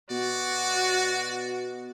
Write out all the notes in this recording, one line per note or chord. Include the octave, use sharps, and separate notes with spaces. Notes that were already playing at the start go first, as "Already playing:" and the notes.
B2 F#4 D5